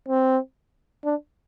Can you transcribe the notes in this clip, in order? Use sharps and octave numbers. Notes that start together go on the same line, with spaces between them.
C4
D4